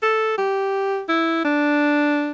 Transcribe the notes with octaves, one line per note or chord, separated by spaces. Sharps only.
A4
G4
E4
D4